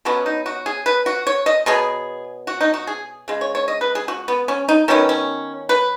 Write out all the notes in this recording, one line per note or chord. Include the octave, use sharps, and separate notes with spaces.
B2 F#3 B3 C#4
D#4
F#4
G#4
B4
F#4
C#5
D#5
B2 F#3 B3 G#4
F#4
D#4
F#4
G#4
C#3 G#3
C#5
C#5
D#5
B4
G#4
F#4
B3
C#4
D#4
D#3 F#3 B3 C#4
C#4
B4